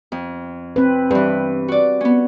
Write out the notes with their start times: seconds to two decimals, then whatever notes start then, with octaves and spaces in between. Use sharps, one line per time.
0.12 F2
0.76 C4 B4
1.11 G2 E3 B4
1.68 F#4 D5
2.01 B3 C#4